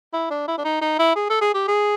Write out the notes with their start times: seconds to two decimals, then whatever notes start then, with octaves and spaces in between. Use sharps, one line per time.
0.13 E4
0.30 D4
0.48 E4
0.58 D4
0.64 D#4
0.81 D#4
0.99 E4
1.16 G#4
1.29 A4
1.41 G#4
1.54 G4
1.68 G#4